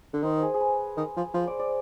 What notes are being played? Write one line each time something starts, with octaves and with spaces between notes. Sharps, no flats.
D3
D#3 C5
G#4
G#4
B4
D#3
F3
F3 C5
D5
D5